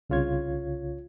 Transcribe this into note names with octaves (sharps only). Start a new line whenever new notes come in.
C2 C#3 F4 C#5 G#6